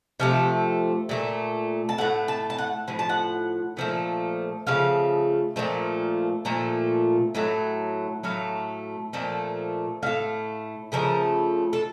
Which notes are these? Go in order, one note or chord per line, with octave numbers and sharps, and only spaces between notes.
C3 F3 A3 F5
A#2 A3
A5
A2 A3 F#5
A5
A5
F#5
A2 F3
A5
F#5
A#2 F3 A3
C#3 F3 A3 F5
A#2 F3 A3
A#2 F3 A3
A2 F#3 A3
A2 F#3 A3 F5
A#2 F3 A3
A2 A3 F5
C#3 F3 A3 A#4
A4